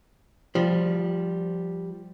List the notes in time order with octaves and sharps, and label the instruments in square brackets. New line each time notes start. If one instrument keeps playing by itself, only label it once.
[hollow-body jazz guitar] F3 G3